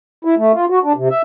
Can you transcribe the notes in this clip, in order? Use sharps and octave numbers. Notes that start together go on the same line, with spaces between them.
E4
A3
F4
F#4
D4
C3
E5